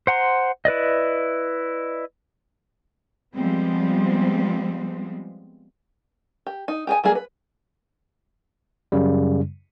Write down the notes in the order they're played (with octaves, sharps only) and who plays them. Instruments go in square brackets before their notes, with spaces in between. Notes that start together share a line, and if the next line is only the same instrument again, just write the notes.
[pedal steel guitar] C5 F#5 A#5 C6
E4 B4 D5 D#5
[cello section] F3 G3 G#3 B3 C4
[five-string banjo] G4
D#4
G4 G#4 B4 G#5
F#3 G3 A#3 G#4
B4
[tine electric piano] F#2 C#3 G3